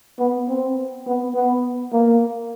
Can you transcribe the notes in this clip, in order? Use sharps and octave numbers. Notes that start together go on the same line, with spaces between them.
B3
C4
B3
B3
A#3